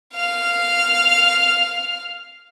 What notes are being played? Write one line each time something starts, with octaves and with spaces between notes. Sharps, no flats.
F5 F6